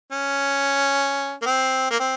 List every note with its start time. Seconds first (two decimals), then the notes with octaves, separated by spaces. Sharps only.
0.12 C#4
1.42 A#3
1.46 C4
1.91 A#3
2.00 C4